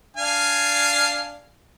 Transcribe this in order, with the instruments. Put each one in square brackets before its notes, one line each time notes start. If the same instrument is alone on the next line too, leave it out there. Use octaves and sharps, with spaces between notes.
[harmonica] D4 F5 G#5